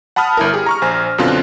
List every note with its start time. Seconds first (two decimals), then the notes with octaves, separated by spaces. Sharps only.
0.16 F#5 A5 B5 D#6 F6
0.37 G1 E4 A#4
0.54 G4 G#4
0.66 A#5 C#6 F6
0.82 A#1 C5 G#5 A#6
1.18 F#2 B2 D3 C4 F4 F#6